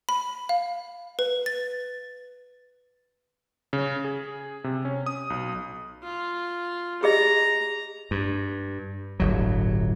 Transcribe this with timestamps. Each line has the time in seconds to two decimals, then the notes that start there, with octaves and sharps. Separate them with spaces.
0.09 B5
0.49 F5
1.19 B4
1.46 A6
3.73 C#3
4.05 G#4
4.64 C3
4.85 C#4
5.06 D#6
5.30 B1
6.03 F4
7.03 G4 G#4 D#5 A#5
8.11 G2
9.20 D1 G1 F#3